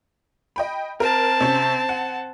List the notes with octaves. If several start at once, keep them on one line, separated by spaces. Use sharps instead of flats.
D#5 G5 B5
C4 A#4 A5
C3 C#4
F#5